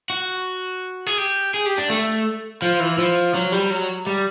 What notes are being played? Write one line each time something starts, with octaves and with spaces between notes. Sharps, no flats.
F#4
G#4
G4
G#4
G4
D4
A3
F3
E3
F3
F#3
G3
F#3
G3